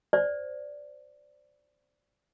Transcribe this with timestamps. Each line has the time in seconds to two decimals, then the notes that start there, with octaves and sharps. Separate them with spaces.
0.13 C5 D5